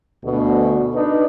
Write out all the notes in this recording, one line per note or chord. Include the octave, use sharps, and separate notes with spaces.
D2 B2
D4 D#4 B4